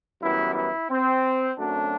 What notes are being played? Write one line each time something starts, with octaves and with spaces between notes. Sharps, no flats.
F#2 E3 G3 B3 E4
E4
C4
F#2 F#3 A3 C4 D4